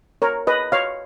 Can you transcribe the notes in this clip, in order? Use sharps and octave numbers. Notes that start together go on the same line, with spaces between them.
A#4 C#5
B4 D#5
C#5 F5